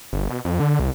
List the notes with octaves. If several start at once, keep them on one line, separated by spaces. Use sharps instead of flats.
G1
B2
F2
D3
C2